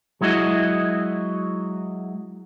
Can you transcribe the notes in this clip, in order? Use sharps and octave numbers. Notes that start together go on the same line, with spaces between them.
F#3 G#3 E4 F#4 D#5